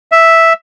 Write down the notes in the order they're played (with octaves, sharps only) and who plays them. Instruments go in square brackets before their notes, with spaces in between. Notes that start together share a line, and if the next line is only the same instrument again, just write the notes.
[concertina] E5